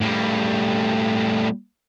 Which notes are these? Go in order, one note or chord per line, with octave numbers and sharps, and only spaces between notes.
A2 G3